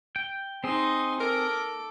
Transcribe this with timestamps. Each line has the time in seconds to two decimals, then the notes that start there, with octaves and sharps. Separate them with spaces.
0.16 G5
0.64 C4 D#4 G#4 C6
1.20 A4 A#4 D6